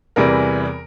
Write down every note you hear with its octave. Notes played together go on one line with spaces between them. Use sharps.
E2 C3 E3 G3 A#4